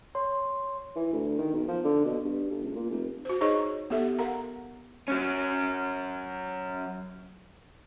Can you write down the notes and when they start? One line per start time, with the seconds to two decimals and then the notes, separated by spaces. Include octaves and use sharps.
0.15 C#5 C6
0.96 E3
1.13 D2
1.38 D#3
1.53 B1
1.68 F3
1.85 D3
2.05 B2
2.24 G2
2.50 G1
2.63 C#2
2.75 A#2
2.90 F1
3.25 F#4 C5
3.41 D#4 G#4 C5 C#5 D#5 C#6
3.90 B3 G4 A4 E5
4.19 A#4 F5 F#5 A#5
5.08 F#3 C#4